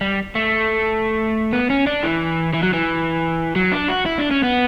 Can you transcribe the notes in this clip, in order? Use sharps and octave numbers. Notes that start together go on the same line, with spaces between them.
G3
A3
B3
C#4
D4
E3
E3
F#3
E3
F#3
D4
F#4
E4
D4
C#4
B3